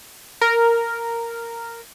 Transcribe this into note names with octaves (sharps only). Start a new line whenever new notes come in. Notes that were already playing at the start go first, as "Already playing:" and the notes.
A#4